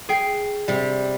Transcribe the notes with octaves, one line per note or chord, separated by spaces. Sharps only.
G#4 G5 C7
C3 G3